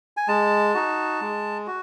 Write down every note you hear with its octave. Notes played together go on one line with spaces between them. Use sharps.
G#5
G#3 A5
D#4 F#4
G#3
F#4